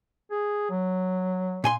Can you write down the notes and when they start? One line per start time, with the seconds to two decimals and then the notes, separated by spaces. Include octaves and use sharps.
0.31 G#4
0.70 F#3
1.64 A#2 G#5 C6